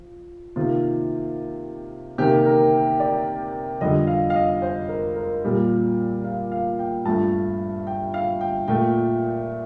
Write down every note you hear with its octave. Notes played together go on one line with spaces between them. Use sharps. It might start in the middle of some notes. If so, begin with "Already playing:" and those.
Already playing: F3
C3 D#3 A#3 F4
C3 D#3 A#3 G4
A#4
D5
F2 D3 G3 D#5
F5
F5
D#5
C5
A#4
A#4
A#2 G3 A#3
F5
F5
G5
G2 F3 A3 A5
G5
F5
G5
A#2 A3 G5